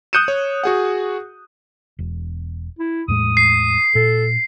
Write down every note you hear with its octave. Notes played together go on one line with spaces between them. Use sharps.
D#6 F#6 G6 C#7 D#7 E7
C#5
F#4 G#4 F#5
E1
E4
E2 A2 G#3 D#6
C7
A#2 A4